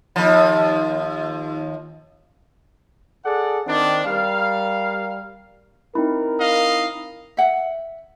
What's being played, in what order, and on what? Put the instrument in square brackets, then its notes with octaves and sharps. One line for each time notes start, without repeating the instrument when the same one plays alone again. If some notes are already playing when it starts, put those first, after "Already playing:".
[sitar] D#2 F3
[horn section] G#4 A4 D5 F#5
D#3 C4 D4
G3 A#4 F5
[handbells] C4 D#4 E4 [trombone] A#4
[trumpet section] D#5 F5
[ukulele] E5 F#5